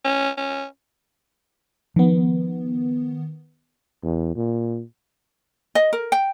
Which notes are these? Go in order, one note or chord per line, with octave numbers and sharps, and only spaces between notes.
C#4
C#4
D#3 F3 B3
E2
A#2
D#5
A#4
G5